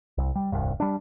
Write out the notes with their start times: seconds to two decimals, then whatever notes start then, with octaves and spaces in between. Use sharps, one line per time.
0.18 C2
0.35 G3
0.52 D#1 C2 G2
0.80 G3 D4